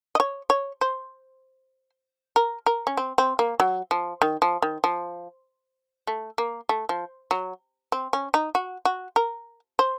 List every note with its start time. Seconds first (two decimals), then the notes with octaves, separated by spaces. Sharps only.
0.15 D#5
0.20 C#5
0.50 C#5
0.81 C5
2.36 A#4
2.66 A#4
2.87 C#4
2.97 C4
3.18 C4
3.39 A#3
3.60 F#3
3.91 F3
4.22 D#3
4.42 F3
4.62 D#3
4.84 F3
6.07 A3
6.38 A#3
6.69 A3
6.89 F3
7.31 F#3
7.92 C4
8.13 C#4
8.34 D#4
8.55 F#4
8.85 F#4
9.16 A#4
9.79 C5